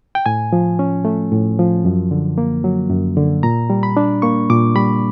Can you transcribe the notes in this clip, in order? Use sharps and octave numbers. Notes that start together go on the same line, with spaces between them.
G5
A2 G#5
F3
C#4
A3
A2
F3
F#2
D3
A#3
F#3
F#2
D3
A#2 A#5
G3
B5
D4
A#3 C#6
A#2 D6
G3 B5